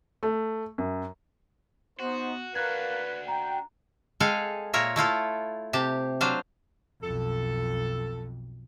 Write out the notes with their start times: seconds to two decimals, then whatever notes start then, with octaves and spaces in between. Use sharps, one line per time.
0.23 A3
0.78 F#2
2.00 B3 D#4 F#4 C5
2.55 D4 F#4 A#4 B4 F5 F#6 G#6
3.28 G5 A#5
4.20 G#3 G#4 A4 F5 G5
4.73 A#2 F4 A#4 C#5 E5
4.96 A3 E4 F4 A4
5.73 C3 G4 A5
6.21 F#3 D4 C5 F5
7.02 B1 F2 A4